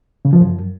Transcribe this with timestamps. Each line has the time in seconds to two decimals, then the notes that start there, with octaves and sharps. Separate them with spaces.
0.25 C#3
0.33 F3
0.41 F#2